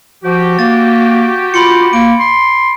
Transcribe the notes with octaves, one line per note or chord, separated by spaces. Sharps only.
F3 F#4 G4
A#3 A6
F4 B5 C6 C#7
A#3 D7
C6